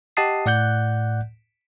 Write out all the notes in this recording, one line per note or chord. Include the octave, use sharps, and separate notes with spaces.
G4 D#5 F#5 A5 D#6 C7
A2 D5 F#5 F#6 G6